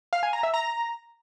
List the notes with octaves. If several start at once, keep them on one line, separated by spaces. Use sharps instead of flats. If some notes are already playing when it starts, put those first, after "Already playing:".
F5
G#5
A#5
E5
A#5